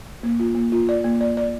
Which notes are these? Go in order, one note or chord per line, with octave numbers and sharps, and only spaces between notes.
A#3
F4
A#3
F4
D5
A#3
D5
D5